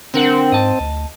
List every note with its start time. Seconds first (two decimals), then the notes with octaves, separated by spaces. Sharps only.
0.14 D3 C4 A#4 F#5
0.52 G#2 D#5 A5
0.80 D2